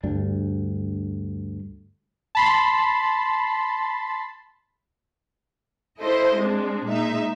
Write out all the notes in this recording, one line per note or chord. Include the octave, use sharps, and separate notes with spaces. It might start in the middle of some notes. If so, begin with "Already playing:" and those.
D2 G2 D4
A5 B5 C6
E4 A4 C5 D#5
G#3 C4 D4
A#2 G#3 D#4 E5